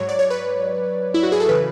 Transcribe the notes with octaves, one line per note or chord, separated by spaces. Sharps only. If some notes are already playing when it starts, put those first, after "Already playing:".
Already playing: G#2 F#3 C#5
D5
C#5
B4
E4
F#4
G#4
A4
C#3 E3 B4